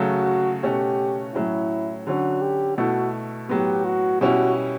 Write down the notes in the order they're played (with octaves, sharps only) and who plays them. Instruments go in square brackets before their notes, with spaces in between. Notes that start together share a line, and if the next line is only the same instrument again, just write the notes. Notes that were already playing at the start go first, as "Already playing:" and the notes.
Already playing: [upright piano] C#3 F#3 A3 [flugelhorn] F#4
[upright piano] B2 A3 C#4 F#4 [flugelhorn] G4
[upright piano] A2 F#3 C#4 [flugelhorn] E4
[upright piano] D3 F#3 C#4 [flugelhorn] F#4
[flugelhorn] G4
[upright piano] B2 A3 E4 [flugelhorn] F#4
[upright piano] A2 F#3 B3 [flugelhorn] G4
[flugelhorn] F#4
[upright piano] B2 G3 C#4 E4 [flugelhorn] F#4